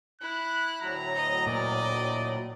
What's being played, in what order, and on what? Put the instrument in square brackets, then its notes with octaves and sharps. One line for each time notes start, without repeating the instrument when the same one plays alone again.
[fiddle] E4 [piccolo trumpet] F#6
[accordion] D2 A2 F#3 [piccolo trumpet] A#5
[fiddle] D#5
[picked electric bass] A#2 [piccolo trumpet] D5